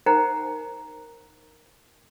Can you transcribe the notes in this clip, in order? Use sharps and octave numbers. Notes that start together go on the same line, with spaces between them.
D#4 A#4 C5 F#5 G5 A#5